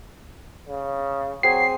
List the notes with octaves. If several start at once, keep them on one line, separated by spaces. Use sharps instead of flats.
C#3
F#3 C4 G#4 G#5 C7